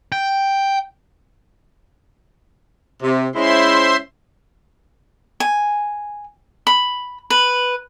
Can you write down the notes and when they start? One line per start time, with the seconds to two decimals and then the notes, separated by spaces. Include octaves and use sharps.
0.12 G5
3.03 C3
3.36 G#3 C#4 E4 C5 E5 C6
5.40 G#5
6.67 B5
7.30 B4